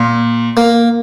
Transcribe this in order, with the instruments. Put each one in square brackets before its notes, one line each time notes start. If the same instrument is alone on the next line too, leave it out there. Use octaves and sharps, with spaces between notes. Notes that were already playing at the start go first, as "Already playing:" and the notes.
Already playing: [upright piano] A#2
[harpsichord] A#3